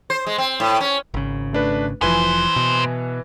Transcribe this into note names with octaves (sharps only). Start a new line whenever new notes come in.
C5
G#3
C4
A2
C#4
G#1 C#3
A3 D4 B4
F1 A#2 E3 F3 B4 C5 G#5
B2